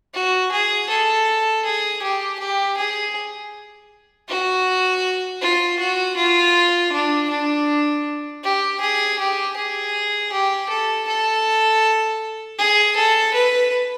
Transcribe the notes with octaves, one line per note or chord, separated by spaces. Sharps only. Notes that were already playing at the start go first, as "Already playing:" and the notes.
F#4
G#4
A4
G#4
G4
G4
G#4
F#4
F4
F#4
F4
D4
D4
G4
G#4
G4
G#4
G4
A4
A4
G#4
A4
B4